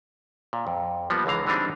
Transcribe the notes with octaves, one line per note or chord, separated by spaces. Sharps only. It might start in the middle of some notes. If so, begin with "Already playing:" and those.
A#2
F2
F3 G3 A#3 B3
C#2 D3 E3 F5 A#5
D3 E3 G3 C4 D4 D#4